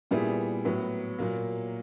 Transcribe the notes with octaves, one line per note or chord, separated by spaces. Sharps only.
A#2 G3 B3 E4 G#4
A2 F#3 B3
A#2 F#3 A#3